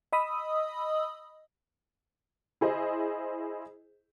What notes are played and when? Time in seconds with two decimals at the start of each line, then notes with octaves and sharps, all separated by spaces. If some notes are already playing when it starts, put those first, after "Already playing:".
0.13 D#5 B5 D#6 E6
2.61 E4 G#4 C5 D#5